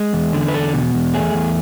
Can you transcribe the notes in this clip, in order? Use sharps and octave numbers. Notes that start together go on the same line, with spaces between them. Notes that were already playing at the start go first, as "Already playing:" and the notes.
Already playing: G#3
E2
D3
B4
E2 A4
B2
E2
A3 G#4
E2